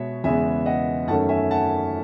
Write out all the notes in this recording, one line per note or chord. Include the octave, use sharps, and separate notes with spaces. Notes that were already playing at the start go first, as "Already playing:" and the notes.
Already playing: B2 G#3 B3 C#5 E5
E2 C#3 G#3 B3 E5 G#5
D#5 F#5
F#2 D#3 A3 C#4 F#5 A5
E5 G#5
F#5 A5